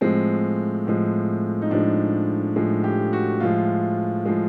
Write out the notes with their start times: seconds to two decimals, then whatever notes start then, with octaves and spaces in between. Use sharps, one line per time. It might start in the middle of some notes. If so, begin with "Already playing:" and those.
0.01 A2 F3 G#3 C4
0.87 A2 F3 G#3
1.62 D#4
1.71 A2 F3 G#3 D4
2.56 A2 F3 G#3
2.84 G4
3.13 F#4
3.40 A2 F3 G#3 F4
4.26 A2 F3 G#3